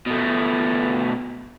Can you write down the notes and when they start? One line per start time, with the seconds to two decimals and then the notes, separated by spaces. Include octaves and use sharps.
0.07 B2 A3